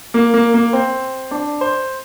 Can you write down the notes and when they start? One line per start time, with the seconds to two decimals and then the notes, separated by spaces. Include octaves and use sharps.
0.14 A#3
0.34 A#3
0.54 A#3
0.73 C4
1.31 D4
1.61 C5